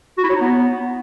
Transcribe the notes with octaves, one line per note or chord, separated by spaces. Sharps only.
F#4
E4
C#5
D#4
B3